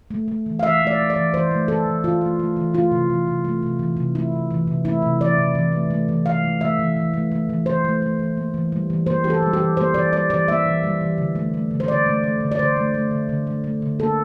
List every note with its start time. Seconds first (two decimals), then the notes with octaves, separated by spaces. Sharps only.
0.11 A3
0.28 A3
0.46 E3
0.59 F5
0.63 E3 E5
0.81 A3
0.87 D5
0.98 A3
1.10 D5
1.16 E3
1.34 E3 C5
1.51 A3
1.68 A3 A4
1.86 E3
2.04 E3 F4
2.21 A3
2.39 A3
2.56 E3
2.74 A3 F4
2.92 C3
3.10 E3
3.28 C3
3.45 A3
3.63 C3
3.79 E3
3.97 C3
4.15 A3 E4
4.32 C3
4.51 E3
4.68 C3
4.85 A3 E4
5.02 C3
5.20 E3 D5
5.38 C3
5.55 E3
5.72 A3
5.90 A3
6.09 E3
6.26 E3 F5
6.43 A3
6.60 A3 E5
6.79 E3
6.96 E3
7.14 A3
7.32 A3
7.49 E3
7.66 E3 C5
7.85 A3
8.02 A3
8.19 E3
8.37 A#3
8.54 E3
8.72 G3
8.90 E3
9.06 A#3 C5
9.24 E3 G4
9.30 A4
9.42 G3
9.53 G4
9.60 E3
9.77 A#3 C5
9.94 E3 D5
10.12 G3 D5
10.30 E3 D5
10.48 A#3 E5
10.66 E3
10.83 G3
11.01 E3
11.18 D3
11.35 A3
11.54 A3
11.71 D3
11.80 C5
11.88 D3 D5
12.06 A3
12.24 A3
12.40 D3
12.52 D5
12.59 D3 C5
12.77 A3
12.94 A3
13.11 D3
13.29 D3
13.47 A3
13.64 A3
13.82 D3
13.99 A#3 A4